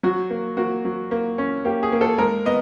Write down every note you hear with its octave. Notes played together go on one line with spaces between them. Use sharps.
F#3 F#4
A#3
A#3 F#4
F#3
A#3
C#4
A#3 G4
G#4
A#3
A4
G#3 A#4
B3 D#5